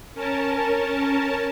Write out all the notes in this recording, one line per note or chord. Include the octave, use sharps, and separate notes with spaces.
C#4 A#4 A5